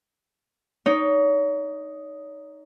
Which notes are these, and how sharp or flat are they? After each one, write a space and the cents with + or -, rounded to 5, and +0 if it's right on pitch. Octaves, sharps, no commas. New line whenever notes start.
D#4 +0 C#5 +35